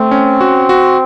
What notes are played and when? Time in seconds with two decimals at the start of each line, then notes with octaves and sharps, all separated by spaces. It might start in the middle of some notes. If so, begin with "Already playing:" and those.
Already playing: A3 C4
0.11 C#4
0.41 F#4
0.69 F#4